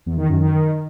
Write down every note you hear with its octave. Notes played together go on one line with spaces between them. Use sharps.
E2
D#3
F#2
D#3